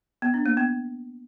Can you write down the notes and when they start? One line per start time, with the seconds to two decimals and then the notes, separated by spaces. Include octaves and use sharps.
0.22 B3
0.34 D4
0.46 A#3
0.57 B3